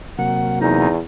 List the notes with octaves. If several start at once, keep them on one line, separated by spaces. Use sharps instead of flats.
C3 F#3 A#3 F#5
E2 D#4